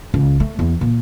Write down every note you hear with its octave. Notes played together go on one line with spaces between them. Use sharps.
C#2
A3
E2
A#2